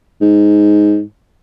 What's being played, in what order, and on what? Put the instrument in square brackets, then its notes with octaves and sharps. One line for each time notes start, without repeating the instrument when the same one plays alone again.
[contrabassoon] G#2